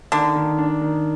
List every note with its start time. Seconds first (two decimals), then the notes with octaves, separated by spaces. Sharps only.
0.12 D3 D#3
0.36 D#3
0.58 D4
0.81 D#3